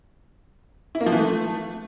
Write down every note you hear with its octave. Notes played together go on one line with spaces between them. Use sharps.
E4
A#3
F3
E3
A3